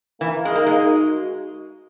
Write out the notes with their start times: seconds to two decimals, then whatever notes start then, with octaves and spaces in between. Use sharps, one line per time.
0.21 E3 A#3
0.38 A#4
0.45 G#3
0.54 A#3 D#4
0.67 G#3 D#4
0.85 F#4